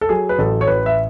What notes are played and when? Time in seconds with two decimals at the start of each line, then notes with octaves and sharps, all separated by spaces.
0.01 A4
0.09 F#3 G#4
0.29 B4
0.38 A1 A4
0.61 C#5
0.67 A1 B4
0.86 E5